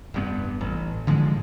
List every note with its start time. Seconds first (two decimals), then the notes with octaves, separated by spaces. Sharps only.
0.14 F1 G2 B3
0.61 A1
1.07 A2 D3 F3 G#3